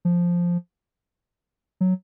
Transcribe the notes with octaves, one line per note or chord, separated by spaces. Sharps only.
F3
F#3